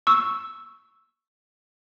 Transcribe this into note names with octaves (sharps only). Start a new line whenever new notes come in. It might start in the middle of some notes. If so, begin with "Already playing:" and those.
C#6 E6